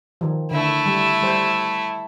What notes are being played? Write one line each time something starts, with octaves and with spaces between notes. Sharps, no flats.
D#3 F3
D3 A3 E4
G3
G3 C5